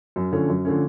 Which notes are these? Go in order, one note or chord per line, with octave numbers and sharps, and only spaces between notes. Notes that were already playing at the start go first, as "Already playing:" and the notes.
F#2
D3 F3 A3 C#4
F#2
D3 F3 A3 C#4